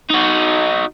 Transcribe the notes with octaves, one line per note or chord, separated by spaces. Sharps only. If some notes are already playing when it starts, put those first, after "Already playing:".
D#4 F#4